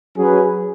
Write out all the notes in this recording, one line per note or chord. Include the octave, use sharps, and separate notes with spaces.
F#3 C#4 G#4 B4